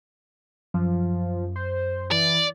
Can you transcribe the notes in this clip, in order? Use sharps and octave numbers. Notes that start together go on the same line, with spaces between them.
F#2 F3
C5
E3 D5